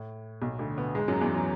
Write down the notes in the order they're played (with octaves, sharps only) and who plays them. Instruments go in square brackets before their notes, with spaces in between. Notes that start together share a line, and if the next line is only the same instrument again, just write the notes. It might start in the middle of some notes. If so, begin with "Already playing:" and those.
Already playing: [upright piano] A2
B1 B2
D2 D3
B2 B3
G#2 G#3
F#2 F#3
E2 E3
F#3